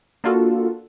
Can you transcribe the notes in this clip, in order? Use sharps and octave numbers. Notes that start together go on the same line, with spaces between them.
A#3 D4 F4 F#4 A4